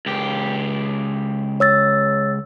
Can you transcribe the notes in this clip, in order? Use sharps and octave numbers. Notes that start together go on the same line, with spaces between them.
C#2 G4
C#5 E6 A6